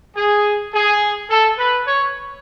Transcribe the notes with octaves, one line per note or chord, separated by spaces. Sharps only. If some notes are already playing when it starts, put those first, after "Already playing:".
G#4
G#4
A4
B4
C#5